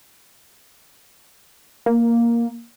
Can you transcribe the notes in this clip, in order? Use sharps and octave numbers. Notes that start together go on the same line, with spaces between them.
A#3